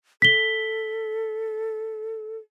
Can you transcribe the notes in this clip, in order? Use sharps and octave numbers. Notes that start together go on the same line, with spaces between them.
A4 B6 G7